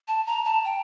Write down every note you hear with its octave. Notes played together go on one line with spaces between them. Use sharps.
A5
A#5
A5
G5